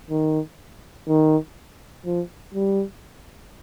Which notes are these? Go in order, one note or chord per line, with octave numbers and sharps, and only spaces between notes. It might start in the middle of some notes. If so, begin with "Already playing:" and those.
D#3
D#3
F3
G3